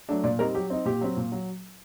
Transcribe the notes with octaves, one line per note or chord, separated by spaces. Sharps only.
F#3 A3 D4
A#2 D5
G3 C4 D#4 A#4
F#3 G4
C4 D#4
A#2 G4
F#3 C4
A#2
F#3